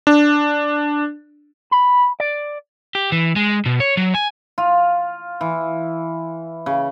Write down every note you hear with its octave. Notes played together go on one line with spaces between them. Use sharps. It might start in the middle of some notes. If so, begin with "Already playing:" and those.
D4
B5
D5
G4
E3
G#3
B2
C#5
F#3
G#5
F4
E3
C#3